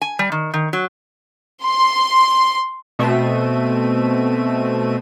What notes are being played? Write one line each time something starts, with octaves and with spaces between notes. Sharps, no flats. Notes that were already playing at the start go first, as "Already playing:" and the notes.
G#5
G3
D#3
D#3
F#3
C6
B2 A3 C4 E5 D#7